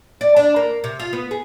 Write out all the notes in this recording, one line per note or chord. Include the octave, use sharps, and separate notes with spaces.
D5
D4
A#3
C3
F4
B3
G#4